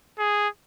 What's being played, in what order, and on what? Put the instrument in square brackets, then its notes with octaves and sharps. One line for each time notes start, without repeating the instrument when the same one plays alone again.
[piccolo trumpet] G#4